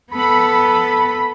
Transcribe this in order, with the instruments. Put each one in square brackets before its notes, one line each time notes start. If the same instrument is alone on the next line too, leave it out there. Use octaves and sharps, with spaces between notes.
[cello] B3 A4 [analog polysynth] B5